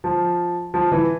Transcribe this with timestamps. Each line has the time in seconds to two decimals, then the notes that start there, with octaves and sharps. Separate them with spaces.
0.04 F3
0.74 F3
0.92 E3